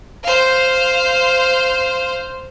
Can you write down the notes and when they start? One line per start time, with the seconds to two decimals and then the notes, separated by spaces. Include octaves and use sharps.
0.23 C5 F5